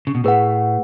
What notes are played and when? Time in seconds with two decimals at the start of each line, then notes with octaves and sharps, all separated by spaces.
0.07 C#3
0.15 B2
0.24 A2 G#4 B4 F#5